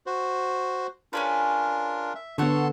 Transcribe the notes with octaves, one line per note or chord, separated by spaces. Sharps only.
F#4 C5
C#4 D4 F4 G#4 A#4 B4
E5
D3 B3 A4 C#5 F#5 A5 C6